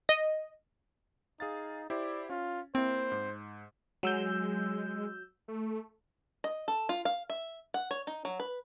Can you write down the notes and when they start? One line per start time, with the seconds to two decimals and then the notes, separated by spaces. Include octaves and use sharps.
0.09 D#5
1.40 D#4 G#4 F5 A6
1.90 E4 G4 C5 D5
2.29 C#4 F4
2.75 A#3 C4 E4 C5
3.12 G#2
4.03 F#3 G#3 E6 G6
5.48 A3
6.44 D#5
6.68 A4
6.89 F4
7.05 F5
7.30 E5
7.74 F#5
7.91 C#5
8.07 D#4
8.25 F#3
8.40 B4